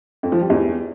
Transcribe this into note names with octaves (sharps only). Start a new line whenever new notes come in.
F2
F3
G3
E2